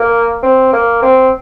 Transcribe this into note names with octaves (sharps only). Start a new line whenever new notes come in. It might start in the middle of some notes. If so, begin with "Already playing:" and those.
Already playing: A#3
C4
A#3
C4